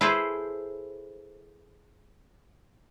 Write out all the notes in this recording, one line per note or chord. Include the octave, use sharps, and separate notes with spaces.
E4 G#4 A4 B4 C5